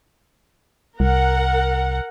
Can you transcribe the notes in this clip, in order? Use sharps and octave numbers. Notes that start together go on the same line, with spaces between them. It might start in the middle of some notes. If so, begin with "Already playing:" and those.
C2 A#4 F#5